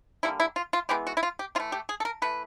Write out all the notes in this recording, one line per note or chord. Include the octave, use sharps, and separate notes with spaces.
D3 G3 A#3 E4
E4
F4
F4
E3 G#3 B3 G4
F#4
E4
F4
G4
E3 A3 F4
G4
G#4
A4
A#4
E3 A3 B4